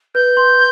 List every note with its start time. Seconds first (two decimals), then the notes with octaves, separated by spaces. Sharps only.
0.15 B4 G6
0.37 C6